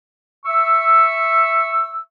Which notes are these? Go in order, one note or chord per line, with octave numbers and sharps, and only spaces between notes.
E5 C#6 E6